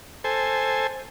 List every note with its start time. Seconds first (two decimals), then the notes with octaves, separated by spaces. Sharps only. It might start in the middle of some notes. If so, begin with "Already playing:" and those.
0.24 A4 C5 G#5